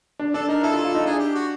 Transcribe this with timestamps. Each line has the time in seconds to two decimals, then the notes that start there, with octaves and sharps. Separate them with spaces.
0.19 D4
0.34 D4 A4
0.48 D#4 A#4
0.63 E4 A4
0.74 F4
0.84 F4
0.95 D#4
1.06 D4 G#4
1.19 G4
1.35 F#4